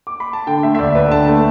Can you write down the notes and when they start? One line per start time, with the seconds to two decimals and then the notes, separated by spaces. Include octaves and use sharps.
0.07 D6
0.20 B5
0.33 A5
0.47 D3 G5
0.63 A3 E5
0.75 E5
0.79 D2 D5
0.95 D2 B4
1.11 D3 A5
1.27 A3